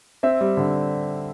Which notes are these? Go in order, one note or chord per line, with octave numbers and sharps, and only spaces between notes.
C4 E5
G3
D3